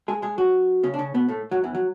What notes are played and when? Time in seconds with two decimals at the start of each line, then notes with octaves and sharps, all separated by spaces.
0.08 G#3 G#4
0.22 G#3 G#4
0.38 F#3 F#4
0.83 C#3 C#4
0.94 D4
0.99 C#3 C#4
1.14 B2 B3
1.28 A2 A3
1.51 F#2 F#3
1.63 E2 E3
1.75 F#3